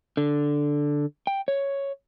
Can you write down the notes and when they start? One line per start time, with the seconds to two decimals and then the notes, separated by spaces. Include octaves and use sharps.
0.17 D3
1.27 G5
1.48 C#5